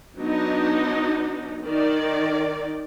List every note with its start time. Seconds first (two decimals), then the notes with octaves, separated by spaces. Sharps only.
0.19 F#3 B3 D4 D#4
1.63 D#3 D5